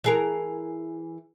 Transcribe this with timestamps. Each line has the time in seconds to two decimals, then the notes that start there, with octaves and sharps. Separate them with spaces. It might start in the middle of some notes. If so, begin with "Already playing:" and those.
0.04 E3 G#4 A#4